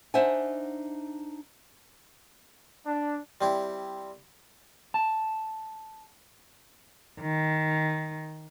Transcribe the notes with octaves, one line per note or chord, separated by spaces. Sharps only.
D4 D#4 C5 E5 F#5 G#5
D4
G3 C4 E4
A5
D#3